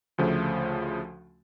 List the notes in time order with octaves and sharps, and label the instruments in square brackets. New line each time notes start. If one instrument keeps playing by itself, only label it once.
[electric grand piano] D2 C#3 F3 A3